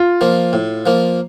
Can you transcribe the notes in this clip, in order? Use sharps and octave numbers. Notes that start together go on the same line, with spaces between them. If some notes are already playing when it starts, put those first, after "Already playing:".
Already playing: F4
F3 A#3
A2
F3 A#3